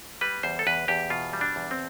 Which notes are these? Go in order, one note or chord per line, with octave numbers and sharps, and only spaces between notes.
G3 B4
E2 C5
A4
E2 B4
E2 G4
B2 F4
G3
D4
E2
C4